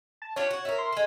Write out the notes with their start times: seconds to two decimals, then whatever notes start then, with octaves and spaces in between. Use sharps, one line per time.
0.22 A5
0.36 D4 F4 G4 C#5
0.51 F#4
0.65 E4 F4 A#4
0.78 C6
0.92 G#3 A4